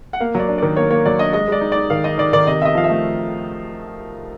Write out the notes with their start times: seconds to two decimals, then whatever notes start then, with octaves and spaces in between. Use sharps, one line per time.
0.13 F#5
0.20 A#3 F5
0.35 F#3 D5
0.49 D4
0.58 D#3 D5
0.77 A#3 C#5
0.91 A#3 C#5
1.06 F#3 D5
1.19 D4 D#5
1.33 G#3 D#5
1.48 G#3 D5
1.61 D#4
1.72 D#4 D5
1.90 D#3 F5
2.04 D#4 D#5
2.18 D#3 D5
2.33 D#3 D5
2.47 C3 D#5
2.61 C3 E5
2.65 D#5
2.75 F3 F5
2.84 E5
2.89 A3